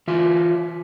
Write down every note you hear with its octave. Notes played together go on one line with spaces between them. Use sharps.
E3 F4 E5